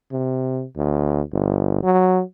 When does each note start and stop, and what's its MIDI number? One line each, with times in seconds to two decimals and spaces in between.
0.12 0.64 48
0.77 1.22 38
1.33 1.80 31
1.83 2.22 54